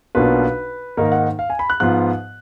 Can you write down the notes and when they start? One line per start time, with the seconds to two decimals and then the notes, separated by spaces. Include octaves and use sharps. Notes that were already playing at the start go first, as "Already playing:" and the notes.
0.15 B1 B2 A#3 D4 F4 B4
0.97 G#2 D#3 A#3 D#4 A#4
1.12 F#5
1.39 F5
1.50 G#5
1.59 B5
1.70 F#6
1.80 G#2 F3 B3 F4 F#6